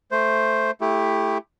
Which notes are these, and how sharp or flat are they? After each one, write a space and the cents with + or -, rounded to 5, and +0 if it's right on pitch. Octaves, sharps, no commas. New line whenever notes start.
A3 +0 C5 +0
A3 +0 E4 +0 G4 +15